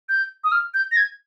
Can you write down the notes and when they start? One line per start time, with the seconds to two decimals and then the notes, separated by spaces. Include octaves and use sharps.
0.09 G6
0.44 D#6
0.52 F6
0.74 G6
0.92 A#6
0.97 G#6